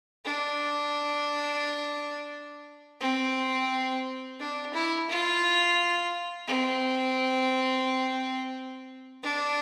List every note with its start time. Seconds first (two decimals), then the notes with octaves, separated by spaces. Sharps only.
0.25 D4
3.01 C4
4.40 D4
4.74 E4
5.09 F4
6.48 C4
9.23 D4